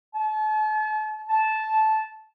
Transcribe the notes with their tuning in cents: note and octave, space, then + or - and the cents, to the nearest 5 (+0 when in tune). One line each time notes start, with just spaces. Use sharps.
A5 -40
A5 -10